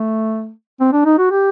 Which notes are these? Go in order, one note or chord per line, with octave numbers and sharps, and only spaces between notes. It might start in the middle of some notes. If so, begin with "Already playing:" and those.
Already playing: A3
C4
D4
D#4
F#4
G4